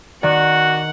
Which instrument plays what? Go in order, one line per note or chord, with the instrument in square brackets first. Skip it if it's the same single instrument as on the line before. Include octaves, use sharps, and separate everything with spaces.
[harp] D#3 [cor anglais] F#4 [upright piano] D5 [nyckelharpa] F#5